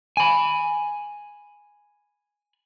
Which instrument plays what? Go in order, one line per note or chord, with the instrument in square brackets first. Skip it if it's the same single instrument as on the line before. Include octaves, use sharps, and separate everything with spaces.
[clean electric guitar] G#5 B5